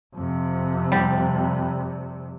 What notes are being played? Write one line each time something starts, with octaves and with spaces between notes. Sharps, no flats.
F2 C3
G3